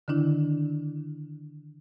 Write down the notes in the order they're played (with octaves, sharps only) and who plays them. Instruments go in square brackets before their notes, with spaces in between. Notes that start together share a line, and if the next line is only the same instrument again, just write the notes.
[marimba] D3 D#3 D4 E4